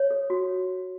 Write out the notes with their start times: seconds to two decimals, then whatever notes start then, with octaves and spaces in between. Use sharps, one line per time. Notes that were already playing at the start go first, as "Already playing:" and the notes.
Already playing: C#5
0.11 A4
0.30 F#4